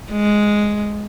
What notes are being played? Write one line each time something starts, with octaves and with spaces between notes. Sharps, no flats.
G#3